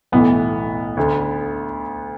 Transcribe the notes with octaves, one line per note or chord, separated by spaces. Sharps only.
B1 A2 E3 B3
D2 D3